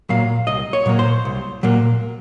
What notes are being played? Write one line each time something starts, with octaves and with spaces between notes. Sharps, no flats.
A#2 F#3 A#3 F5
C2 D#5
C#5
A#2 F#3 A#3
C5
C2
A#2 F#3 A#3